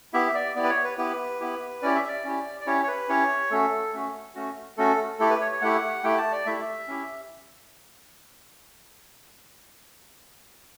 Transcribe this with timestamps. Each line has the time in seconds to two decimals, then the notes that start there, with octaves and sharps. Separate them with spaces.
0.13 B3 E4 G4 E5
0.35 D5
0.56 B3 E4 G4 D5
0.64 B4
0.70 C#5
0.84 B4
0.98 B3 E4 G4 B4
1.40 B3 E4 G4
1.82 C#4 E4 G4 D5
1.95 E5
2.08 D5
2.24 C#4 E4 G4
2.60 D5
2.67 C#4 E4 G4 C#5
2.83 C#5
2.88 B4
3.09 C#4 E4 G4 C#5
3.51 A3 C#4 F#4 A4
3.93 A3 C#4 F#4
4.35 A3 C#4 F#4
4.77 A3 C#4 F#4 A4
5.19 A3 E4 G4 A4
5.30 B4
5.41 C#5
5.52 C#5
5.61 A3 E4 G4 F#5
6.03 A3 E4 G4 G5
6.18 A5
6.32 D5
6.46 A3 E4 G4 E5
6.88 C#4 E4 G4